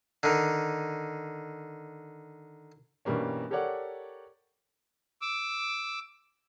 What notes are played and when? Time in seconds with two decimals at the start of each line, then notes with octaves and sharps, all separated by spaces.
0.23 D3 D#3
3.05 G2 B2 E3 G3 A#3 C#4
3.51 G4 A4 A#4 C#5 D5 F#5
5.21 D6 E6